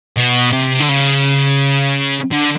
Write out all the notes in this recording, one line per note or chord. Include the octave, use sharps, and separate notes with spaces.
B2
C3
D3
C#3
D3